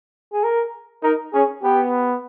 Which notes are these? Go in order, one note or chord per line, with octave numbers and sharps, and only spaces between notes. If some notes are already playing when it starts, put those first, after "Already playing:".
G#4
A#4
D#4 A#4
C#4 G#4
B3 G4